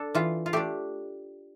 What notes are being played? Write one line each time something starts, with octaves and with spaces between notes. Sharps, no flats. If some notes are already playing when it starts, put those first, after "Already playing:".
Already playing: D4 A4
E3 F4
F4
A3 D4 G4